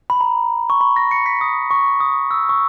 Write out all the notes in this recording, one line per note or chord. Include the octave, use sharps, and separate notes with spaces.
B5
A#5
C#6
B5
A#6
C#7
B6
D#6
C#6
D#6
E6
C#6